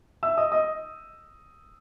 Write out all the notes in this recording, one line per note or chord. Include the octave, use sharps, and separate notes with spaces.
E5 E6
D#5 D#6
D#5 D#6